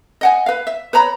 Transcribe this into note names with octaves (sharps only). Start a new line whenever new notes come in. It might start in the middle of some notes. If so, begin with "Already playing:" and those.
D#5 F#5 G#5
B4 F5
E5
B4 C#5 A#5 B5